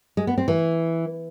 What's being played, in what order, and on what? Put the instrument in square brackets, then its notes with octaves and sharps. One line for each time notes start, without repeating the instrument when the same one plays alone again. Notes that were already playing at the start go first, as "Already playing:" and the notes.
[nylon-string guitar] G#3
B3
C4
E3